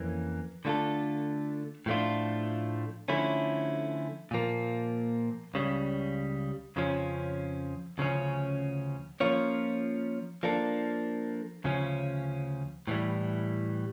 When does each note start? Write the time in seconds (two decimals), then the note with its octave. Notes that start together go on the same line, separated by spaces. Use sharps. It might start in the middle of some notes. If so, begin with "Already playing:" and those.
Already playing: F2 E3 A#3 C#4
0.65 D3 A3 D4 F4 A4
1.86 A2 F3 A3 D4 F4
3.08 D3 F3 A3 C#4 E4
4.31 A#2 F3 A#3
5.54 C#2 C#3 G3
6.76 F2 C#3 F3 C#4
7.98 D2 C#3 F3 C#4
9.20 F3 A#3 C#4 F4 C#5
10.43 F3 A#3 D4 A4
11.64 D2 C#3 F3 C#4
12.87 A2 E3 G3